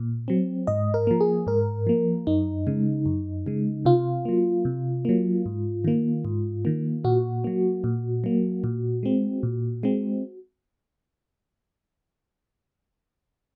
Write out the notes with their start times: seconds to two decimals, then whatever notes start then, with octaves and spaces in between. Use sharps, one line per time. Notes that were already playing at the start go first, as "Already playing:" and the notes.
Already playing: A#2
0.28 F#3 C4
0.67 G#2 D#5
0.94 A#4
1.07 F3 A#3
1.21 G#4
1.47 G#2 A#4
1.87 F3 A#3
2.27 F#2 D#4
2.67 C#3 G#3
3.06 F#2
3.46 C#3 G#3
3.85 C3 F4
4.25 F#3 A#3
4.65 C3
5.05 F#3 A#3
5.46 G#2
5.84 D#3 A#3
6.25 G#2
6.65 D#3 A#3
7.04 A#2 F#4
7.44 F#3 A#3
7.84 A#2
8.24 F#3 A#3
8.64 A#2
9.03 G#3 C4
9.43 A#2
9.83 G#3 C4